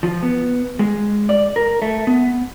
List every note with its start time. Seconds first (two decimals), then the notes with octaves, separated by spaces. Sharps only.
0.03 F3
0.23 B3
0.79 G#3
1.29 D5
1.56 A#4
1.82 A3
2.07 B3